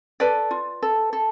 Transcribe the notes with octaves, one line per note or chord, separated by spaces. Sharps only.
A4 B4 D5
F4
A4
A4